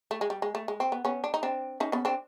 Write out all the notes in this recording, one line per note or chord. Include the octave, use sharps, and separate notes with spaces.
A3
G#3
G3
G#3
A3
G#3
C4
B3
B3 C#4
D4
D#4
C4 D4
C#4 D#4
B3 C#4
C4 D4